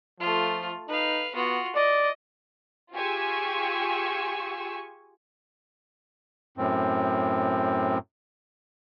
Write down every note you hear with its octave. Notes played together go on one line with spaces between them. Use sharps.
F3 A3 F4
D#4 B4 F5
B3 F4 F#4
D5 D#5
F4 G4 G#4 G#5 C#6 E6
F#2 A2 C4